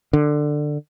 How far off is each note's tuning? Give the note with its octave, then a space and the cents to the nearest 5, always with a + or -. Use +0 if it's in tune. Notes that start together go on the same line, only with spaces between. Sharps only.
D3 +15